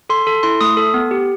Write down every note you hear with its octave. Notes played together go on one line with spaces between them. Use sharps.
A4 C6
A4
E4 C6
A3 D#6
A4
B3
G4